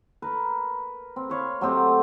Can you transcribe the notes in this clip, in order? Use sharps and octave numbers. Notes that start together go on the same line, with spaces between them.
A#4 B4
C4
B4 C#5 F5
F#3 A3 C4 G4